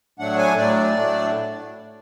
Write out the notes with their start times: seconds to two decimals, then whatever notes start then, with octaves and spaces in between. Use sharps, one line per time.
0.19 A2 F#3 A3 D4 F#5
0.38 G#5
0.57 A2 F#3 A3 D4 D5
0.96 A2 F#3 A3 D4